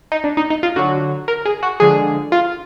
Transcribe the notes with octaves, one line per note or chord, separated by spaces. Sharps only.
D#4
D4
D#4
D#4
F4
D3 F#3 F#4
A#4
G#4
F#4
D3 F3 G#3 G#4
F4